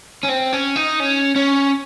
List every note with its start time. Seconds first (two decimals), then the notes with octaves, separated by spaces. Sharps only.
0.23 C#4
0.28 C4
0.53 C#4
0.76 D#4
1.00 C#4
1.36 C#4